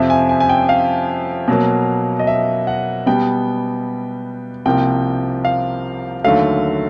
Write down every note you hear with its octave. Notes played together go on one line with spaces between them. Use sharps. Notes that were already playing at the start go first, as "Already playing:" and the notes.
Already playing: F2 C3 F3 E5
G#5
G#5
G#5
G5
F5
B2 F#3 A#3
D#5
E5
F#5
B2 G3 B3 G5
C2 C3 F3 A#3 G5
F5
D#2 D3 F#3 A3 F5